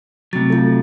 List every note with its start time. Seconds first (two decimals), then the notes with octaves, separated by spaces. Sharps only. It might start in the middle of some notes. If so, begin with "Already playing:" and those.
0.33 C3 F#3 A3 A6
0.50 F4 A4